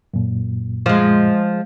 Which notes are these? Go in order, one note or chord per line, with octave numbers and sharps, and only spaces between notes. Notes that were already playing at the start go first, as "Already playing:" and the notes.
F#2 A#2
F3 G#3